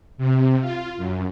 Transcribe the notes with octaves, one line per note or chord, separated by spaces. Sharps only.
C3
F4
F#2